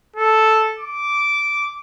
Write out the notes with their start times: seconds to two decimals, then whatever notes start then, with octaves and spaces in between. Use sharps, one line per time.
0.16 A4
0.79 D6